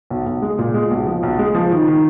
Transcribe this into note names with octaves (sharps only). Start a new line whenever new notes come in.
B1
B1
G#3
A#2
G#3
B1
F3
B1
G#3
F3
D#3
D#3